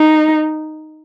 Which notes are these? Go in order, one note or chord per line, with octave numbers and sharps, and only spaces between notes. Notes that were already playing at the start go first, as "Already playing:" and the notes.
Already playing: D#4